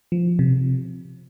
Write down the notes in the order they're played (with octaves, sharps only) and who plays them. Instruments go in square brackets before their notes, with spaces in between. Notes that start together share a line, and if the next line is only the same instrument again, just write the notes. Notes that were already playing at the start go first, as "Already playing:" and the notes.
[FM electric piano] F3
C3